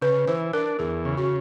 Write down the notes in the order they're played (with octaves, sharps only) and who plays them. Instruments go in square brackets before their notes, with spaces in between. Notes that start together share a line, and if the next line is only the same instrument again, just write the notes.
[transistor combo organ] C#3 [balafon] B4
[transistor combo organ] E3 [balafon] C5
[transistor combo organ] D4 [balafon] A#4
[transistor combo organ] E2 [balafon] G#4
[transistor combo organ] C#3
[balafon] F#4